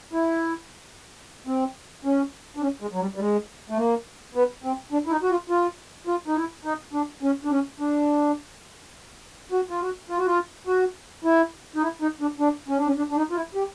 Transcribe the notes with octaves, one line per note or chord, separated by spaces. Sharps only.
E4
C4
C#4
D4
C#4
G#3
F#3
G3
G3
G#3
A3
A#3
B3
C4
D4
E4
D#4
F#4
F4
F4
F4
D#4
E4
D#4
D4
C#4
D4
C#4
D4
F#4
F4
F#4
F4
F#4
F4
F#4
E4
D#4
E4
D#4
D4
D4
C#4
D4
C#4
D4
D4
D#4
F4
E4
G4